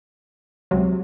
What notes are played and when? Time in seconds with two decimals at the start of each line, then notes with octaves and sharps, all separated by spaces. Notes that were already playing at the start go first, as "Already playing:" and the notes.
0.71 C#2 C3 F#3